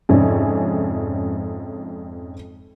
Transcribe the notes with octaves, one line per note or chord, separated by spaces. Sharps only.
F2 G#2 C3 C#4 D4